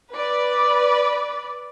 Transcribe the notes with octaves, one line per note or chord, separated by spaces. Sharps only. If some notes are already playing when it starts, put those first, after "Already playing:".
B4 D5